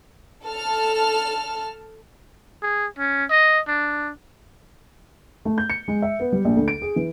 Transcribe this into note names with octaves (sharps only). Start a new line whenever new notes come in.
A4 A5 F6
G#4
C#4
D#5
D4
A3
G6
C#7
G#3
E5
B3
G3
A#1
D2
D7
G#4
E3